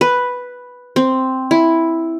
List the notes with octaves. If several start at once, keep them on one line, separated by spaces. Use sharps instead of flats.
B4
C4
E4